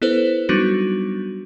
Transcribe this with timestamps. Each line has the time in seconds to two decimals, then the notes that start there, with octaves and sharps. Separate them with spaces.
0.02 B3 E4 A4 B4 C5
0.49 F#3 G3 B3 D4 D#4 F#4